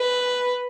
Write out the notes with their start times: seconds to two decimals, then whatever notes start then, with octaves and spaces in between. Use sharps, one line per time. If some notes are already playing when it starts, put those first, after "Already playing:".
Already playing: B4